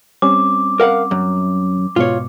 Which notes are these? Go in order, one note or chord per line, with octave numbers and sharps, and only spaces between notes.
G3 C4 C#4 D6
A#4 F5 F#5
F#2
G#2 B2 F4 C#5